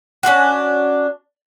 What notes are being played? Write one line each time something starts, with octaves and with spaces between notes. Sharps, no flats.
C#4 D4 F4 F#4